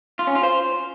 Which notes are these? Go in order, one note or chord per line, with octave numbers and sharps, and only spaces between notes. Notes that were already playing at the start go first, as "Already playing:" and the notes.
F4
C#4
F4
C5